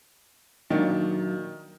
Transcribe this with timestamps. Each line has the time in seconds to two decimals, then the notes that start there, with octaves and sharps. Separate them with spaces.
0.70 A#2 D#3 F#3 D4